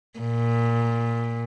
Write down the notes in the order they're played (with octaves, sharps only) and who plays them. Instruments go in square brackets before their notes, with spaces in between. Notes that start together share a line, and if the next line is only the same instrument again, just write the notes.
[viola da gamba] A#2